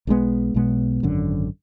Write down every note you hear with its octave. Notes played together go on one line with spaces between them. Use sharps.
B1 B2 G#3 B3
B1 B2 G#3 B3
G#1 F#2 D3